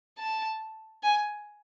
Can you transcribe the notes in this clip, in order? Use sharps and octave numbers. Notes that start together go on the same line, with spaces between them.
A5
G#5